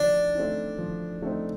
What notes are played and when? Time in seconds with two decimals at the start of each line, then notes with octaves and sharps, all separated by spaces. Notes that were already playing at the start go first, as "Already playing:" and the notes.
Already playing: F3 A3 D4 D#4
0.35 A3 C4 D#4
0.78 F3
1.22 A3 C4 D#4